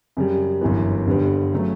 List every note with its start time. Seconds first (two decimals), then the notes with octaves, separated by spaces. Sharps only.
0.17 F#2 C#3 G3
0.61 G1 F#2 E3 B3
1.07 G1 G2 D3 G3 B3
1.54 C#3 F#3 A3